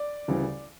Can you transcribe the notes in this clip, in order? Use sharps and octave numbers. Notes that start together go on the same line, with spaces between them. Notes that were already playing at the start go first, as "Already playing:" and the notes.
Already playing: D5
D2 C#3 E3 G3